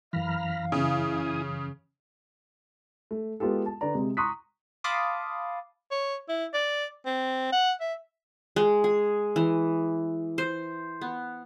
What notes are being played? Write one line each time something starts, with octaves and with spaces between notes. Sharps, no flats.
F#2 E3 F5 A#5 B5 F6
C#3 E4 G#5 D#6
A3
G#3 B3 F4 G4 A4
A5
D3 B4 D5 A#5
C3 G#3
A#5 C6 C#6 D#6 F#6 B6
F5 A5 B5 C6 D6 D#6
C#5
E4
D5
C4
F#5
E5
G#3
G#4
E3
C5
B3